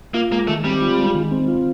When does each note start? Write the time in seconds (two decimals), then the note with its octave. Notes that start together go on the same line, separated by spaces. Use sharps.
0.14 A#3 F4
0.31 G#3 A#3
0.47 D#3 A3
0.64 G3 C4
0.82 F4
0.98 G#3
1.15 D#3
1.32 C4
1.48 F4